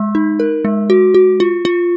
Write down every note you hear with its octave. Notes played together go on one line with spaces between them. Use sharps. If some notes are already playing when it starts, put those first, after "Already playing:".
Already playing: G#3
D#4
A#4
G#3
F#4
F#4
F4
F4